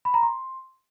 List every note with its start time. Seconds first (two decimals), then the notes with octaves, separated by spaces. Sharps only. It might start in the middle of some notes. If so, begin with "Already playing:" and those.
0.05 B5
0.14 A#5
0.23 C6